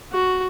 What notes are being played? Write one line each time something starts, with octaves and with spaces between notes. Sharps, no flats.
F#4